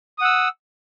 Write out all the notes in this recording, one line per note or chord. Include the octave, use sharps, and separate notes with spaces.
F#5 D#6 E6